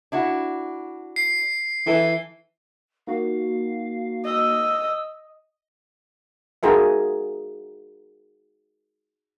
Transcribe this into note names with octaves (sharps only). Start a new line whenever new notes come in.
D4 E4 F#4
C7
E3 E4 A4
A#3 D#4 F#4 F5
D#5 E6
D#4 F4 F#4 G#4 A#4 E5